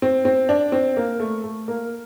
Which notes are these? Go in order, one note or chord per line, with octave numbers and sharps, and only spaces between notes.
C4
C4
D4
C4
A#3
A3
A3
A#3